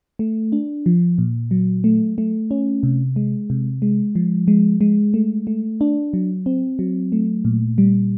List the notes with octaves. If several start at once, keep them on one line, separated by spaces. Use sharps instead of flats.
A3
D4
F3
A#2
F#3
A3
A3
C#4
C3
G#3
C3
G#3
F3
G#3
G#3
A3
A3
D4
F#3
C4
F#3
A3
A#2
G3